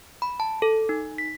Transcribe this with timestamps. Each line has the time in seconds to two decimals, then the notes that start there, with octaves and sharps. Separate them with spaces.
0.22 B5
0.40 A5
0.62 A4
0.89 D#4
1.18 B6